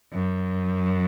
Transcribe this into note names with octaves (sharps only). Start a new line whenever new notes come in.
F#2